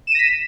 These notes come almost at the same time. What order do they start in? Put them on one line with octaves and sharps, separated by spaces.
E7 D#7 A#6 B6